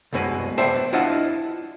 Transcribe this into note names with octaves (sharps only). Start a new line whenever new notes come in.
C2 F#2 B2 G#3 B4 G#5
B4 C5 D5 E5 G5 A5
D4 E4 F4 D#5 F#5 A5